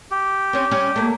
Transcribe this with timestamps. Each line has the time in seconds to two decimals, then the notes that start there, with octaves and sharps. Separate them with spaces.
0.11 G4
0.53 C4 C#4 C#5
0.71 G3 C#4
0.96 A3 A#3